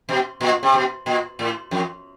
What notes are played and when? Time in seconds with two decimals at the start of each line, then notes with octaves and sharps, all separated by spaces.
0.09 B2
0.41 A#2
0.63 C3
0.74 B2
1.06 A#2
1.39 A2
1.71 F2